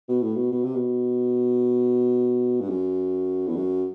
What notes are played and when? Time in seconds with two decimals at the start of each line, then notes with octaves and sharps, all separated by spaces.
0.09 B2
0.22 A2
0.36 B2
0.52 B2
0.64 C3
0.75 B2
2.60 G2
2.69 F#2
3.47 E2
3.56 F#2